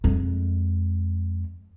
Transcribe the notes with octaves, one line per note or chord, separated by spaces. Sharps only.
F2 G#3